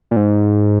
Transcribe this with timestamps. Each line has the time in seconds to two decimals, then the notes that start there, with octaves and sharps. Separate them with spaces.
0.11 A#2
0.16 G#2